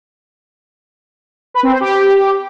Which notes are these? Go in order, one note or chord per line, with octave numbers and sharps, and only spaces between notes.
B4
C4
C5
G4